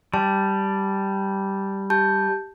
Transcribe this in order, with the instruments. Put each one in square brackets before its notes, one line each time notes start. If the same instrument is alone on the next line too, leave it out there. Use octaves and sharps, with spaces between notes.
[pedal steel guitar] G3 [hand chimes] A5
[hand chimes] G4 A5 G6